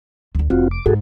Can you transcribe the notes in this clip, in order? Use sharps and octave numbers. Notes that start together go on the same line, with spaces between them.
D2 D3 A3
F1 C4 F4 F#4
D6
G#2 F#4 G#4 A4